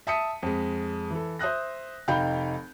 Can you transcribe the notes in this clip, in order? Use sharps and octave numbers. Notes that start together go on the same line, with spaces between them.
E5 A5 D#6 B6 C#7 D#7
F2 G#3
E3 A4
C5 E5 D#6 F#6 A#6
F1 D#4 F5 G5 B5 G6